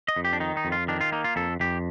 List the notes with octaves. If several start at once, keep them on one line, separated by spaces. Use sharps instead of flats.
D#5
F2
G4
D4
D#3 D#4
D#4
F2
F4
D#3 D4
F4
A#3 D#4
F4
F2 A4
F2 G4